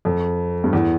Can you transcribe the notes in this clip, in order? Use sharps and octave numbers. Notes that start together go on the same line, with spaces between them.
F2
G2
E2